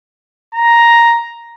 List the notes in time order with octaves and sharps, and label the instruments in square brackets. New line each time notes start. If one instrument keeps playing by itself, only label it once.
[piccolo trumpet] A#5